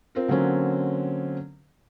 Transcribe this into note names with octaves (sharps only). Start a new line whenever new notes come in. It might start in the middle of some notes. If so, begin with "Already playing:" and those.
C4 F4 A#4
D3 F#3 A#3 C4 C#4